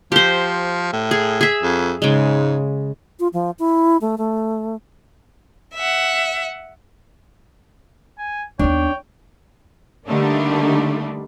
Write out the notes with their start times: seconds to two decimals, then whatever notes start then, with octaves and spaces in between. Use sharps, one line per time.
0.12 F3 G4 C5
0.93 A2
1.11 G#4
1.41 G#4 E5
1.63 F2
2.02 G#2 C#3 G#3
3.19 F4
3.33 F3
3.59 E4
4.01 A3
4.18 A3
5.74 E5 F#5
8.18 G#5
8.59 D#2 B3 D4 C#5 G5
10.08 D3 G3 A3 A#3 D4 D#4